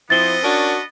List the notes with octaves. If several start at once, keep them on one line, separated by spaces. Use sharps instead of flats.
F3 B3 C4 E4 D#5 A6 G7
C#4 D4 F#4 A#4